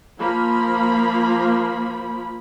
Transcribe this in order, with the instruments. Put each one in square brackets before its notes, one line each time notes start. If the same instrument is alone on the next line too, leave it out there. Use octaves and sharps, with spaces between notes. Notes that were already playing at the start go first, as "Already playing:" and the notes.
[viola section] F3 A#3 B5